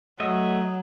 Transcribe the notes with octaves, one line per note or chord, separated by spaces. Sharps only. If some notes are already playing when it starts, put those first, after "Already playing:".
F#3 A3 D#5 E5